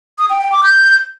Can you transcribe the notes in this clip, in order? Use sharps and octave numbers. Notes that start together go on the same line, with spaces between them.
D#6
G5
G5
D6
G6